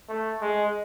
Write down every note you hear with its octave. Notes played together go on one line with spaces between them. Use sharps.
A3
G#3